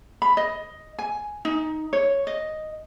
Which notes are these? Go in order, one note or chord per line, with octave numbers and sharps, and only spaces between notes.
B5
D#5
G#5
D#4
C#5
D#5